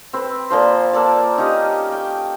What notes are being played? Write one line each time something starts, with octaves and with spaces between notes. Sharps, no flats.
C4 B4
A#2 F3 C5
A#3 A4 D5 A5
C#4 D#4 G4 D#5
G5